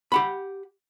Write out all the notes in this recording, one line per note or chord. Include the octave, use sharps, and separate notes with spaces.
G4 F#5 B5